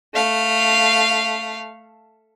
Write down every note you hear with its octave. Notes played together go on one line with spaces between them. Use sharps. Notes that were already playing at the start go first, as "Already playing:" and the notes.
A3 F5